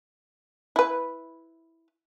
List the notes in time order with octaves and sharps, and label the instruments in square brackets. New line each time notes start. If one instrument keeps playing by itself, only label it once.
[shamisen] E4 B4